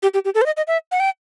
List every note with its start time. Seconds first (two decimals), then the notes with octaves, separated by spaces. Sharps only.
0.03 G4
0.14 G4
0.25 G4
0.35 A4
0.42 C5
0.46 D#5
0.57 D#5
0.68 E5
0.92 F#5
1.00 G5